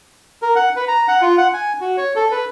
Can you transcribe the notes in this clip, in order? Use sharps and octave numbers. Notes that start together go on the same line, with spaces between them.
A#4
F#5
B4
A#5
F#5
F4
F#5
G#5
F#4
C#5
A4
B4